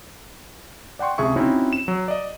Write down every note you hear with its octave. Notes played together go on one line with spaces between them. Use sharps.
D5 F#5 G5 C6 C#6
C#2 C3 G#4 E5 C#6
C4 C#4 D#4 E4 F#4
E7
F#3
D5 D#5